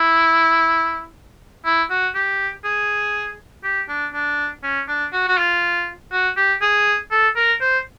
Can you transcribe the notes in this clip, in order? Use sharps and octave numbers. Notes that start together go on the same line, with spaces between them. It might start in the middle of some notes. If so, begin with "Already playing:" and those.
Already playing: E4
E4
F#4
G4
G#4
G4
D4
D4
C#4
D4
F#4
F#4
F4
F#4
G4
G#4
A4
A#4
C5